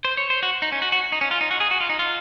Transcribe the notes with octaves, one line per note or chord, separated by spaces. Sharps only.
C5
C#5
C5
F#4
D#4
C#4
F#4
F#4
D#4
C#4
F4
D#4
F#4
G#4
F#4
F4
D#4
F4